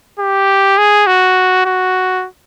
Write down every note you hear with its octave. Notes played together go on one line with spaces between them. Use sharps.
G4
G#4
F#4
F#4